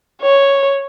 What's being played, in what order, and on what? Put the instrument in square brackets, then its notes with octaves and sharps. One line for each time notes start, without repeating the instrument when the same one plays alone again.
[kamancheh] C#5